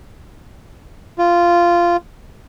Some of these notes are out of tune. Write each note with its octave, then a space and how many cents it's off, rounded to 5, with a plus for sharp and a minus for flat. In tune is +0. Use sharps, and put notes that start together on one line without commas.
F4 -10